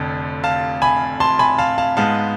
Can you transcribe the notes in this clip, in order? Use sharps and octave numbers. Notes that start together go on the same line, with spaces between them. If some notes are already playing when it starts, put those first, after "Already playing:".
Already playing: F1 F2 D3
F5 A5
G#5 B5
A5 C6
G#5 B5
F5 A5
F5 A5
G#2 G#3 B3 F5 A5